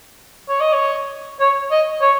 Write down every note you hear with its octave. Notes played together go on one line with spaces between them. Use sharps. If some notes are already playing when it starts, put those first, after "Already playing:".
C#5
D#5
C#5
C#5
D#5
C#5